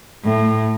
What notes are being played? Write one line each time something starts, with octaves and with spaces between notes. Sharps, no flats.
A2